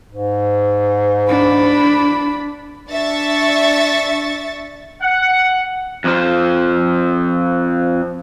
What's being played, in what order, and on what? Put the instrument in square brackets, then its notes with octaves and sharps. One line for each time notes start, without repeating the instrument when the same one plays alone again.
[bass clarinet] G#2
[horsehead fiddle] D4 B5
[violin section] D4 E5 C#6 A6
[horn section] F#5
[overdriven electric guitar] F2 F3